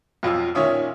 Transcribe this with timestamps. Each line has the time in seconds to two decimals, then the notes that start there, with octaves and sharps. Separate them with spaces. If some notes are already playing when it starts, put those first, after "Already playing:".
0.23 B1 F2 F4 E6
0.55 A#2 D#3 C#4 C#5 E5 D#6